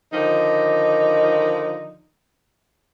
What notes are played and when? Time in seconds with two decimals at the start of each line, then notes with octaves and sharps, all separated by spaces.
0.12 D3 D#3 F3 D#4